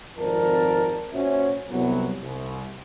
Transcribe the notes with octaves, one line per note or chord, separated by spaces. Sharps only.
G#1 F2 C4 A#4 D5 A5
A#2 C#4 F#4 C5 C#5 E5
C2 F#3 B3
C2